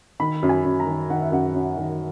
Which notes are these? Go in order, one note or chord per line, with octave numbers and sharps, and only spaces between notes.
D#3 B5
F#2
G#5
F#2
A#5
D#3
D#3 F#5
E5
F#2 F#5
F#2
D#3